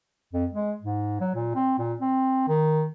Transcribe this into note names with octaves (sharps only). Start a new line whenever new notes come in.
F2
G#3
G#2
F#3
A#2
C4
A#2
C4
D#3